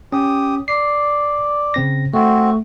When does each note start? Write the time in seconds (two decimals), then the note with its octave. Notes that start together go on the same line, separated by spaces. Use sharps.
0.13 C#4 G4 D#6
0.68 D5 C7
1.74 C#3 C4 A#6
2.14 A3 C4 F#4